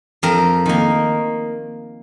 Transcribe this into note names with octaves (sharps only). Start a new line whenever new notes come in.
F2 A#4
D#3 A#3